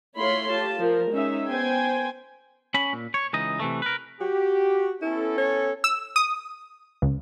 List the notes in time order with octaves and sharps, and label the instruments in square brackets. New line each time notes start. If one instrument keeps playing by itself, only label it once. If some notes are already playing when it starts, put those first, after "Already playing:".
[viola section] A3 E4 F4 C#5 B5 C6
F4 G4 A5
F3 A#4
G#3 C#4 D#4 E5
B3 C5 G5 G#5
[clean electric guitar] C#4 B5
A#2
C#5
C#2 E3 D#4 D#5
C3 E3 A3
A#4 B4
[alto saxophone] F#4 [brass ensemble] G4
[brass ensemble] B3 C#4 A4 [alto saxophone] E4
[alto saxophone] C#5
[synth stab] E6
D#6
C#2